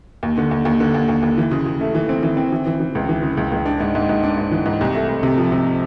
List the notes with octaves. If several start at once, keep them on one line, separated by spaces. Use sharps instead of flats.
D#2
D3
D#2
D#2
D3
D#2
D#2
D#2
E3
C#3
C#3
A3
E3
C4
E3
C4
E3
E3
E3
C#2
E3
C#3
C#2
C#2
D4
G#2
G#2
G#2
D4
G#2
E3
G#2
C2
A3
C2
C3
F3
C3